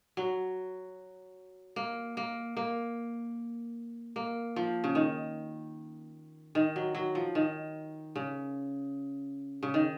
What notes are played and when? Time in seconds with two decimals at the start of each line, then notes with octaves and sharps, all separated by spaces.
0.17 F#3
1.76 A#3
2.17 A#3
2.57 A#3
4.16 A#3
4.56 F3
4.84 C#3
4.95 D#3
6.55 D#3
6.76 F#3
6.95 F#3
7.15 F3
7.35 D#3
8.16 C#3
9.63 C#3
9.74 D#3